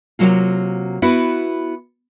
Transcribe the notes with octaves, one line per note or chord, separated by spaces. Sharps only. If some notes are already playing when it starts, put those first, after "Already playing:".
C3 F3 F#3 A#3 F4
B3 E4 F#4 B4